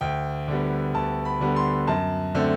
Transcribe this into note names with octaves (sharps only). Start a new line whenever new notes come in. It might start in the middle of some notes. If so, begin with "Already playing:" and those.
D2 G5
D3 G3 B3
D2 A5
B5
D3 G3 B3
C6
F#2 A5
D3 A3 C4